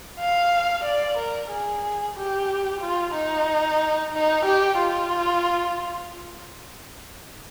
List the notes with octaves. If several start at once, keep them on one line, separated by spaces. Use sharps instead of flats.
F5
D5
A#4
G#4
G4
F4
D#4
D#4
G4
F4